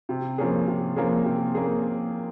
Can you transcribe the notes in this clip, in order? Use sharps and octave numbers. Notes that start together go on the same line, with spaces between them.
C3
F3 A#3 C#4 G#4
C3
F3 A#3 C#4 G#4
C3
A#3 C#4 G#4